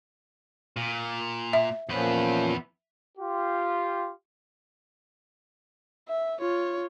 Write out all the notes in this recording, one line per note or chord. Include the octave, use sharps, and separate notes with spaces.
A#2
E5
E2 A#2 F3 C#4 B4
F4 G4
E5
F4 C#5